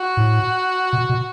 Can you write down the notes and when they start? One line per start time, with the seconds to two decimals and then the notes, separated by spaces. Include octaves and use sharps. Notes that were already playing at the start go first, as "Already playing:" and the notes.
Already playing: F#4
0.17 A2
0.93 B2
1.09 B2